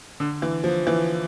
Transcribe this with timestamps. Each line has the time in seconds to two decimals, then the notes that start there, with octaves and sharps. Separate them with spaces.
0.20 D3
0.42 E3
0.64 F3
0.87 E3